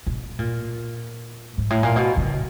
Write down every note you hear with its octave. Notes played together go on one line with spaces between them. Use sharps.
B2
A#2
G#2
A2
A#2
B2
C#3